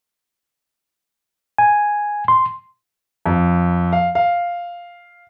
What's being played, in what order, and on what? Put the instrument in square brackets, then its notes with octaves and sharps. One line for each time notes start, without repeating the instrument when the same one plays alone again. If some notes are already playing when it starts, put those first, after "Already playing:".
[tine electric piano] G#5
C6
[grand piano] F2
F5
F5